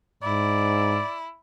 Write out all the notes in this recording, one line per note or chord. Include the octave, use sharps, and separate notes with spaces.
G#2 E4 D5